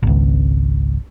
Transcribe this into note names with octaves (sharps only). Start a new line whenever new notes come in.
G#1 C#2